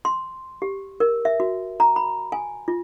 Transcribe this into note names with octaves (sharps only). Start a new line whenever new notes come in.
C6
G4
A#4
E5
F#4
A#5
B5
G#5
F4